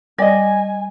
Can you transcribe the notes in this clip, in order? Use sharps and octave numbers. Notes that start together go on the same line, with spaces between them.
G3 D5 D#5 G#5